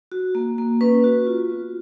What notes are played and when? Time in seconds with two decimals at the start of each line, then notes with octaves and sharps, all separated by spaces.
0.12 F#4
0.35 A#3
0.58 A#3
0.81 C#4 B4
1.04 F#4
1.27 F4
1.50 B3